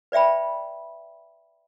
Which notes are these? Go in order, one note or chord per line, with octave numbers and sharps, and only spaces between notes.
B4 D5 E5 G5 B5